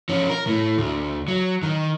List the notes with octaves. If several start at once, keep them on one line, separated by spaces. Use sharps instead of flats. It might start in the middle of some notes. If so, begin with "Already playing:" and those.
F3 C#4
A#4
A2
D2
F#3
D#3